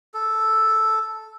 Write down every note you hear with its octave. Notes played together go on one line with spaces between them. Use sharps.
A4